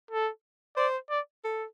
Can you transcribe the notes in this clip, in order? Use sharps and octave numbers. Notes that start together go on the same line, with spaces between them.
A4
C5 D5
D5
A4